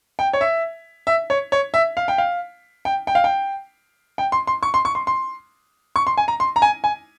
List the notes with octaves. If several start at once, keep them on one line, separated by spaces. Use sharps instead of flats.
G5
C#5
E5
E5
C#5
C#5
E5
F5
G5
F5
G5
G5
F5
G5
G5
C6
C6
C#6
C6
C#6
C6
C6
C#6
C6
G#5
A#5
C6
A#5
G#5
G#5